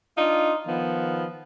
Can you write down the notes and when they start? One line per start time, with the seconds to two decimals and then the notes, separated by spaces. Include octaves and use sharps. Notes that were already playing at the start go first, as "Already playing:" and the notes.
0.17 D4 D#4 F4
0.67 D#3 F3 B3